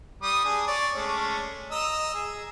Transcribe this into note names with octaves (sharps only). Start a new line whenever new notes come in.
G3 D#6
D4 G#4
C#5 D5
G#3 A3 C#4
D#5 A#5 E6
G#4